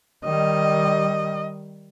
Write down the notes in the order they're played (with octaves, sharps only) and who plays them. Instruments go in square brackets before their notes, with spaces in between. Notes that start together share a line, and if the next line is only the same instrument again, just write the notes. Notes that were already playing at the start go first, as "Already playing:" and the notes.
[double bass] D#3 G3 [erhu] D#5